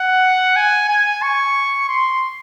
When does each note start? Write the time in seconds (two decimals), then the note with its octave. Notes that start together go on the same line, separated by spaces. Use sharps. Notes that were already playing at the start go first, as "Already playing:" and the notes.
Already playing: F#5
0.56 G#5
0.89 G#5
1.22 C#6
1.88 C6